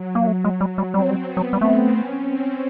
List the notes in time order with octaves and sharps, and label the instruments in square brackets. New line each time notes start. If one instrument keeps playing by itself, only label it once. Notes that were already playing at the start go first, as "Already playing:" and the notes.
Already playing: [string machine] F#3
[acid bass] A#3
A3
G#3
G3
G3
[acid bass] G3 [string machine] C4
[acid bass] F#3
G3
[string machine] B3
[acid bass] F#3
G3
[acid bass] A3 [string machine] C4
[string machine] C#4
C4